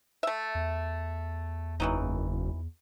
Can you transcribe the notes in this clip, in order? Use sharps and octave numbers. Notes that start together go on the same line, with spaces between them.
A3 E5
E2
F#1 E3 F#3 D#4